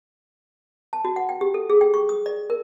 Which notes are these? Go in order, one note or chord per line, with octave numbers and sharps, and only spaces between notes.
A5
F#4
F#5
G5
G4
A4
G#4
G5
C#6
D#6
D5
A#4